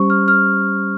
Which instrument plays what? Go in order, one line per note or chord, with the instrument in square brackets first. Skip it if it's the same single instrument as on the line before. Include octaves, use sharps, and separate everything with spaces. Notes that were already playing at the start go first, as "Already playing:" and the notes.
Already playing: [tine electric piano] G3 C#4 G4 C5 [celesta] C#6
[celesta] F6
F6